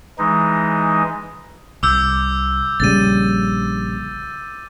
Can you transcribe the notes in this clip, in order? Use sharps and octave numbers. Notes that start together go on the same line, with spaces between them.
E3 G#3 D#4
C2 D6 E6 G6
A#1 C#3 G3 A6 D#7